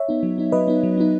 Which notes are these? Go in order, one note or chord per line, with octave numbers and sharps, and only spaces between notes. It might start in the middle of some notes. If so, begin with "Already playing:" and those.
Already playing: C#5 E5
B3 D#4
F#3
B3 D#4
F#3 B4 D#5
B3 D#4
F#3
B3 D#4